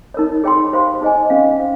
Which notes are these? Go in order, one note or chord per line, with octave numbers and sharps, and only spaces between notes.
D#4 A#4 C#5
G#4 C#5 G5 C6
G4 C5 F5 C6
D#4 G#4 C5 D#5 G#5
C#4 G#4 C5 F5
C5 F5